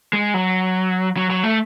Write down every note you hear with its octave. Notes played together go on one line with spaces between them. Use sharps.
G#3
F#3
F#3
F#3
A3